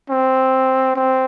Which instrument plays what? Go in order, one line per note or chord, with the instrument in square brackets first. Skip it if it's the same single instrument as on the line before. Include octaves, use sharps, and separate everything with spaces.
[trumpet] C4
C4